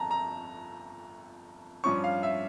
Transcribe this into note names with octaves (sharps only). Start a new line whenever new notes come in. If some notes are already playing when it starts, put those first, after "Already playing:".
Already playing: G1 F2 A5 A#5
A#5
G2 F3 C#4 C#6
F5
E5